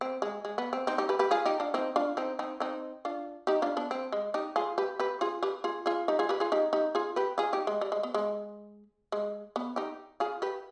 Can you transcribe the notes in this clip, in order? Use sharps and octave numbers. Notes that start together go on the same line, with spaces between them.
C4
G#3
G#3
B3
C4
C4 D#4
D#4 G4
G4 B4
G4 B4
F4 G#4
D#4 G4
D4 F4
C4 D#4
D4 F4
C4 D#4
C4 D#4
C4 D#4
D4 F4
D#4 G4
D4 F4
B3 D4
C4
G#3
D#4 G4
F4 G#4
G4 B4
G4 B4
F4 G#4
G4 B4
F4 G#4
F4 G#4
D#4 G4
F4 G#4
G4 B4
F4 G#4
D#4 G4
D#4 G4
F4 G#4
G4 B4
F4 G#4
D#4 G4
G#3
G3
G#3
B3
G#3
G#3
B3
D#4 G4
F4 G#4
G4 B4